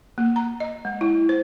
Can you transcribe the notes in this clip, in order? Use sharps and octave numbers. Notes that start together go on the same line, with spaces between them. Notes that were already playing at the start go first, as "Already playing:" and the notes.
A#3
A#5
D#5
G#3
E4
C5